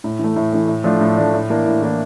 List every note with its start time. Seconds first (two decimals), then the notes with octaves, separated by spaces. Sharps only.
0.04 A2
0.19 E3 A3
0.36 A2
0.52 E3 A3
0.68 A2
0.84 F3 A3 D4
1.01 A2
1.17 F3 A3 D4
1.34 A2
1.50 E3 A#3 D4
1.66 A2
1.82 E3 A#3 D4